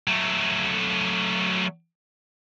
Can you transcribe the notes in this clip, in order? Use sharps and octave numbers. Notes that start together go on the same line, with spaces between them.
F#3 A3